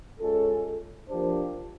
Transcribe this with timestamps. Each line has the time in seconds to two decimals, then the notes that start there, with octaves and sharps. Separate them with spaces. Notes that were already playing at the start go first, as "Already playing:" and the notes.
0.20 G#3 C#4 F4 A4
1.08 F3 A#3 D4 G4 C5